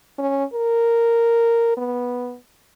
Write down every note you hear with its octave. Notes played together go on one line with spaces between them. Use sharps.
C#4
A#4
B3